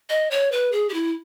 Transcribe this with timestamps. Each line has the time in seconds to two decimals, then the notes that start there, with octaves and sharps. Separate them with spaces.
0.09 D#5
0.31 C#5
0.52 B4
0.72 G#4
0.89 G4
0.94 E4